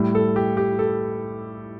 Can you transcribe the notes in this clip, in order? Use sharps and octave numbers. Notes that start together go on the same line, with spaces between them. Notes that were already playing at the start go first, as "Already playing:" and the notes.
Already playing: A2 G3
A4
G4
G4
A4